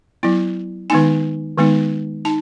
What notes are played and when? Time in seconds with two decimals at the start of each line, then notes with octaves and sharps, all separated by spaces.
0.23 F#3 B3 E4
0.90 D#3 G#3 B3 D#4 G#5
1.58 D#3 G#3 B3 D#4
2.25 D#4 A5